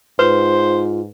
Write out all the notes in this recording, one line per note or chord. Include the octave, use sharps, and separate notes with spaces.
G#2 F4 B4 C5